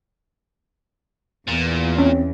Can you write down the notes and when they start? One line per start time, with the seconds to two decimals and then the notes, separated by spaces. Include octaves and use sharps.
1.47 E2 A#2
1.98 C4 C#4